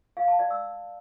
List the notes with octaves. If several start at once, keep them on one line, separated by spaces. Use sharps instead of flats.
F5
A5
D5
E6